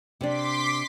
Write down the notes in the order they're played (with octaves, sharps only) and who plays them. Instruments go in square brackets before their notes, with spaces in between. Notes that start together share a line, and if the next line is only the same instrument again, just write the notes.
[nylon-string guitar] C3 C4 D4 [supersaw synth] C6 D6 B6